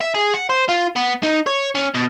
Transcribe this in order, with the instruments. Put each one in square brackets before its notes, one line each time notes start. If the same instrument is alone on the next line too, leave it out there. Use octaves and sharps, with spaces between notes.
[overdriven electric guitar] E5
G#4
F#5
C5
F4
B3
D#4
C#5
C#4
B2